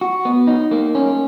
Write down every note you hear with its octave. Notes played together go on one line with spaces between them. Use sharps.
F#4
B3
D#4
A#3
C#4